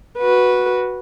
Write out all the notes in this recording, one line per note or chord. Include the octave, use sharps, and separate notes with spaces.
F#4 B4